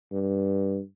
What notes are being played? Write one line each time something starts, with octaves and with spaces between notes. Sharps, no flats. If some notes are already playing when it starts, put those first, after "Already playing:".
G2